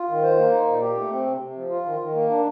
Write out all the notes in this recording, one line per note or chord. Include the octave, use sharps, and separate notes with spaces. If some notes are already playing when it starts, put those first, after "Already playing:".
Already playing: F4
D#3
C5
A#3
D#4
A#2
G4
A3
C4
C3
C3
F3
F4
D#3
D#3
A#3
D4